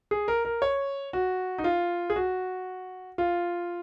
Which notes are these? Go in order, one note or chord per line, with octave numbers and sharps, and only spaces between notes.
G#4
A#4
A#4
C#5
F#4
D#4
F4
G#4
F#4
F4